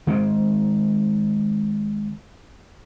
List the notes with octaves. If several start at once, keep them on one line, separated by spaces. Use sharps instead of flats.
D#3 G#3 A3 C4